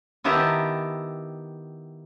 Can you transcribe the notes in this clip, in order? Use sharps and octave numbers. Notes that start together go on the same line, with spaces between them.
D#3 B3 E4 G4 A5 A#5